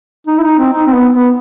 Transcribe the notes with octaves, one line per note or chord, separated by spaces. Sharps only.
D#4
E4
D#4
C4
D#4
C4
B3
B3